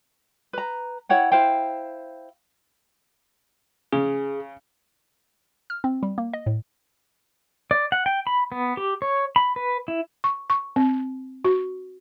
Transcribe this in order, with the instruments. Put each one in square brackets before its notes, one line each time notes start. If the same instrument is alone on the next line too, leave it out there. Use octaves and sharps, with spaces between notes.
[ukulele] B4 A#5
E4 C#5 F#5 G5
E4 C5 F5 G5
[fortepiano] C#3 [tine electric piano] G#4
[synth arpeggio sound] F6
C4
G3
A#3
D#5
A2
[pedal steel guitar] D5
F#5
G5
B5
B3
G4
C#5
B5
B4
E4
[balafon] C#6
C#6
C4
F#4